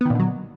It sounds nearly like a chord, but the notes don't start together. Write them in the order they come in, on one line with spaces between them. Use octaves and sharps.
B3 D#3 A#2 D3 F#3